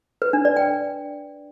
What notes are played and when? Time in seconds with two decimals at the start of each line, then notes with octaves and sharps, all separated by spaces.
0.22 B4
0.33 D4
0.45 D5
0.57 G5